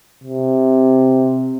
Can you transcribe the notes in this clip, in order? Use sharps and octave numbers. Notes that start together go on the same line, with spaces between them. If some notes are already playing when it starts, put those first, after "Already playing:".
C3